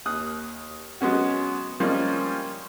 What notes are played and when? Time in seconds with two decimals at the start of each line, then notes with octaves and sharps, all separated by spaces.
0.05 D#2 D#6 F#6
1.01 F#3 G#3 B3 C#4 F#4
1.80 F3 G3 G#3 A#3 C#4 F4